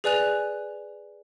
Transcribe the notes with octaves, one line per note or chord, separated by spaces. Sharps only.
G#4 B4 D5 G#5 F#6 F7